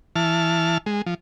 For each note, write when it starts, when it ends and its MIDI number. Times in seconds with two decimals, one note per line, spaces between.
0.16 0.78 52
0.16 0.78 81
0.16 0.78 89
0.86 1.02 56
1.06 1.14 53